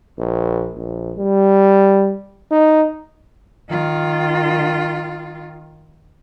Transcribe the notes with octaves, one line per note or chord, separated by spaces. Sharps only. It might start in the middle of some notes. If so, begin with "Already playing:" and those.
A#1
A#1
G3
D#4
D#3 F4